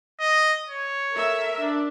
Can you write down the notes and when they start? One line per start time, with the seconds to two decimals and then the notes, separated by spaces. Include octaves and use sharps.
0.20 D#5
0.69 C#5
1.15 A4 A#4 E5
1.59 D4